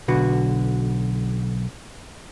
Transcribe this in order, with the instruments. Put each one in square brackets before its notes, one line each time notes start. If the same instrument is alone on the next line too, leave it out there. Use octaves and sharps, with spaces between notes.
[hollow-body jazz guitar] B1 D3 F#4 B4